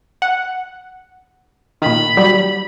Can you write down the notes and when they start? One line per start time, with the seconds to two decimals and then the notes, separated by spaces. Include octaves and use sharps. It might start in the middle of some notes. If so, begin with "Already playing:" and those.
0.22 F#5
1.82 A#2 D#3 B5
2.17 F#3 G3